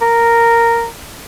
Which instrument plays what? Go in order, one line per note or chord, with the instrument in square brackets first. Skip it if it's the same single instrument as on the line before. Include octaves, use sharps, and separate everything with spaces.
[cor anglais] A#4